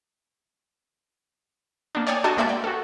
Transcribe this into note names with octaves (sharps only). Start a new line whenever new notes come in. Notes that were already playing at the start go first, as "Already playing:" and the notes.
A#3 D4
C#5 D5 G5 G#5 D#6
D4 F#4 A4 D#5 G#5 A5
G#3 A#3 D5 E5 F#5 G6
G5
F#4 A4